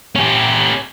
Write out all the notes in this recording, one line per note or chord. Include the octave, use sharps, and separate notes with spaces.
C#4 G4